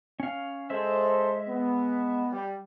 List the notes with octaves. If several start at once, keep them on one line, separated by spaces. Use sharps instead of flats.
C#4 F5
G#3 G#4 A4 C5 E5
B3
G3